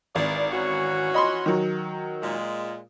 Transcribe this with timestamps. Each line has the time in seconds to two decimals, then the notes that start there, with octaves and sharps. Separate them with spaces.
0.15 G#1 G#2 E3 D5
0.52 E3 C#4 F#4
1.14 D#5 B5 C6
1.46 D#3 F#3
2.23 A#2 G#3